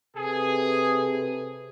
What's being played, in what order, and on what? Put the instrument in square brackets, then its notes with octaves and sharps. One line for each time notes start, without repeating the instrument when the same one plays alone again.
[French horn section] C3 A4 B4 [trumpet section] G#4